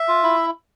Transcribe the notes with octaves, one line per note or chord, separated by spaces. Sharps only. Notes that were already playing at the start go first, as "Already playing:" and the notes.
Already playing: E5
F4
E4